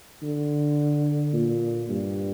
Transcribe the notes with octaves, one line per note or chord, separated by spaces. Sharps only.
D3
A#2
G2